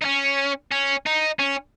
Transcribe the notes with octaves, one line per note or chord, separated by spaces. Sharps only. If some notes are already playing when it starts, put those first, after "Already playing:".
D#4
C#4
C#4
D#4
C#4